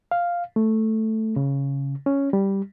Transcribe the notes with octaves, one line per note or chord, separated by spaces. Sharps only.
F5
A3
C#3
C#4
G3